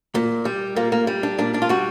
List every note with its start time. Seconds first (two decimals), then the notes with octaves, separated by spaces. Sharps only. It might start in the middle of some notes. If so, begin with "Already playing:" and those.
0.15 A#2
0.45 G3
0.76 A#2 A#3
0.92 A#3
1.07 G3
1.23 D4
1.39 A#2 D4
1.54 D4
1.62 F4
1.69 G3 F#4